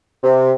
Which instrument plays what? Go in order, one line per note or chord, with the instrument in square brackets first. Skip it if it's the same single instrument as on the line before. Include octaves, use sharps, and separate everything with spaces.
[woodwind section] C3